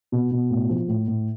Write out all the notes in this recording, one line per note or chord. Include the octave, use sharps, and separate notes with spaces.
B2
B2
A2
F3
A2
A2